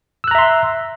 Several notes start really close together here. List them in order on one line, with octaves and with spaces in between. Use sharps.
E6 F#6 A#5 E5 C6